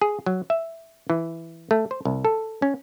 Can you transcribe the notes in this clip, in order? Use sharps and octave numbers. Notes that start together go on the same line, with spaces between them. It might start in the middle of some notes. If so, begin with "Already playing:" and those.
G#4
F#3
E5
E3
A3
C5
C2
A4
C#4